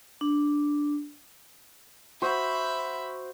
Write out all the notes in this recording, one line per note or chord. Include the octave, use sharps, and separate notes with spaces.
D4
F#4 C5 E5 B5